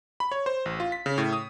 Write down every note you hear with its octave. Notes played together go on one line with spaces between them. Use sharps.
B5
C#5
C5
A1
F4
B6
C#3
A2
D#6